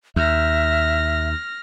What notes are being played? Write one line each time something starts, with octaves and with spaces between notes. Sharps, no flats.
D#2 E5 F6 A#6